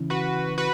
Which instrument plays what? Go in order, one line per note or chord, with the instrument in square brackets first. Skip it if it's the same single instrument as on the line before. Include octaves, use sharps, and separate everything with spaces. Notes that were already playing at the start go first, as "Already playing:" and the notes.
Already playing: [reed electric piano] C#3 E3 C#4 E4
[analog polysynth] F#4 B4
F#4 B4